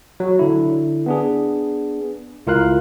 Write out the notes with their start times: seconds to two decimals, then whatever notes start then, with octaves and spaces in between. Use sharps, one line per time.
0.20 F#3
0.39 D3 E4
1.06 B3 D4 G#4
2.47 C#2 E4 F4 A#4 F5 F#6